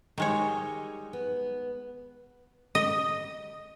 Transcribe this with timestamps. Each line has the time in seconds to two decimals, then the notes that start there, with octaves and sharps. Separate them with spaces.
0.18 D#3 G3 G#3 D#4 C#5
1.13 B3
2.75 D#5